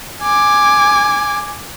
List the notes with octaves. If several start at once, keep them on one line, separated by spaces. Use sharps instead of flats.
G#5 D6